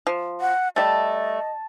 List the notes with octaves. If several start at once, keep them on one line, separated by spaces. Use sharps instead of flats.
F3
F#5
G3 A3 D#5 A5